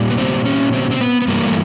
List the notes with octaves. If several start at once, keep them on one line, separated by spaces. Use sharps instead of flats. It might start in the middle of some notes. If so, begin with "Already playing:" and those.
Already playing: A#2 G3
B3
C4
C#4
C4
C4
B3
B3
G2 E3 G3 A#3
A3